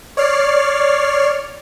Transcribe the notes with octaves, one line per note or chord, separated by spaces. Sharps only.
C#5 D5 F6 C7